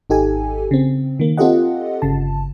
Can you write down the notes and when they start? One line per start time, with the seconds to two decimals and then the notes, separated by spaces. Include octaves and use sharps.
0.10 G#1 D#4 G4 A4 G#5
0.71 C#3 C4
1.20 D#3 A#3
1.38 C4 F4 G4 A4 D#5 F#5
2.02 G1 C#3 A5